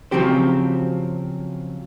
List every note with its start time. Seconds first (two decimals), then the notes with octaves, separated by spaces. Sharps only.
0.11 C#3 F3 F#3 C4 G4 C5